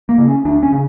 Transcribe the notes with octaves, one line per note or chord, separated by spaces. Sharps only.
A#3
C#3
C#4
D2 D4
C#4
C#3